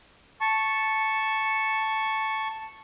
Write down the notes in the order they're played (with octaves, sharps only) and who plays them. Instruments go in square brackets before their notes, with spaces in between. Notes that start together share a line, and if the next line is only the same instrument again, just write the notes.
[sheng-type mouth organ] A5 C#6